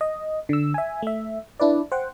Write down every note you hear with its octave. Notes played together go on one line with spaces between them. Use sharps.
D#5
D3 E6
E5 G#5
A3 E5
D4 E4 B4 D5
C5 F#5 G5